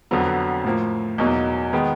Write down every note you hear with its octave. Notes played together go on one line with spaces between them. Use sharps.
F2 D3 F#3 B3
A2 F3 A#3
E2 B2 F#3 A#3 D#4
D#3 G#3 B3